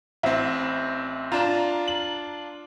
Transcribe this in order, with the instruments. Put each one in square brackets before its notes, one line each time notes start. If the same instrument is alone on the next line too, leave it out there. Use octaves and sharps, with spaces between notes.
[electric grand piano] A1 C4 [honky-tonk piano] E4
[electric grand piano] D4 F4 [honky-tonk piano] A#5 E7
[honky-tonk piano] F#7